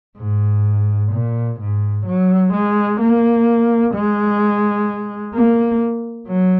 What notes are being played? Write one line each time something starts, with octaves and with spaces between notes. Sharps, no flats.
G#2
A#2
G#2
F#3
G#3
A#3
G#3
A#3
F#3